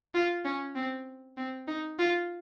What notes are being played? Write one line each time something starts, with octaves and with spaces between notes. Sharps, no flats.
F4
C#4
C4
C4
D#4
F4